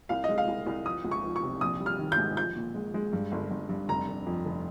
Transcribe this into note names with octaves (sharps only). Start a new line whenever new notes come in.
C2 F5
D#5
G#3
F5
C2
C2
F3 D#6
C#2
C#6
F3
C#6
C3
A#1 D#6
G3
F6
D#3
G6
G#2
F3 G6
A#2
G#3
G#3
G2
G1
G1
G2
F1 A#5
F1
F2
F1